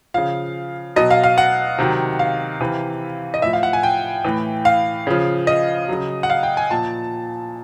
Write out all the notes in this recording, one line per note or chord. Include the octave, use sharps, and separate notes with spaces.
C#3 F3 F5
B2 F#3 D#5
F5
F5
F#5
C3 D#3 F#3
F5
C3 E3
D#5
A2 F3 E5
F5
F#5
G#5
G5
A2 E3
F5
C#3 F3
D#5
C#3 F#3
F#5
F5
G5
G#5
A#2 F3 A5